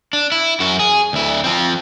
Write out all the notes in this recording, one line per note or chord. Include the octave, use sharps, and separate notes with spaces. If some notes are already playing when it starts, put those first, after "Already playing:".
D4
E4
F#2 F#4
G#4
D2 E4
F3 C4